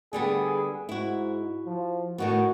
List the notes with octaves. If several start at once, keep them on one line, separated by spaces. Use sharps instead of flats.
D3 G3 B3 G#4
G#2 E4 F#4
F3
A2 D#3 B3 F#4